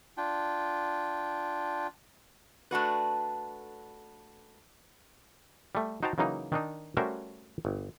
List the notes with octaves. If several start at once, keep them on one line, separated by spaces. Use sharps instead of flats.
D4 F4 G5
A3 D4 F#4 B4
G3 A3
D#4 F#4 C5 G5 A5 A#5
C#3 E3 F#3 A#3 D#4
D#3 D4 D#4
G3 A3 C#4 F#4 A#4 C5
G1